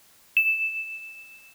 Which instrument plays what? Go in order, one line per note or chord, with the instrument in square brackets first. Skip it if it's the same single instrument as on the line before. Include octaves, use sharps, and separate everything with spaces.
[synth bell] E7